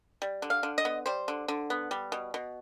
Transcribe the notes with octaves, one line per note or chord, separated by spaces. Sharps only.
G3
D3
F5
D3
D#5
B3
G3 C5
D3
D3
B3
G3
B2
B2